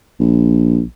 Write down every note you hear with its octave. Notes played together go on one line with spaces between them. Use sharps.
A#1